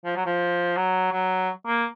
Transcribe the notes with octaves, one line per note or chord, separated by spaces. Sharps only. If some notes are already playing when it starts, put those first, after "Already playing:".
F3
F#3
F3
F#3
F#3
A#3